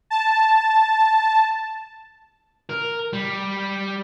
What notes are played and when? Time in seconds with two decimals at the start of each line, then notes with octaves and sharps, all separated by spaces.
0.10 A5
2.69 A#4
3.13 G3